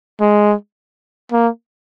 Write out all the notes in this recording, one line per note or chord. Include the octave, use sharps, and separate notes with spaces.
G#3
A#3